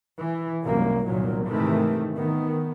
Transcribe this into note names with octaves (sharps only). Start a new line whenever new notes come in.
E3
F1 C2 F#2 A#3
G1 C2 A#2 D#3 F#3
G#2 C3 D#3 E3 A3
D#3 B3